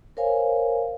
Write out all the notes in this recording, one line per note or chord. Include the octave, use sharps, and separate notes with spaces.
A#4 C5 C#5 F5 G#5